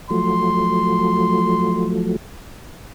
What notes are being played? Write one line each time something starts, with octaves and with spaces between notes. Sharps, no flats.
F3 F#3 A3 C6